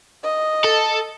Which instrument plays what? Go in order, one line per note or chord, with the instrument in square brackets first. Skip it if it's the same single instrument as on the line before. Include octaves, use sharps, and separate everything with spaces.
[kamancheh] D#5
[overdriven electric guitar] A4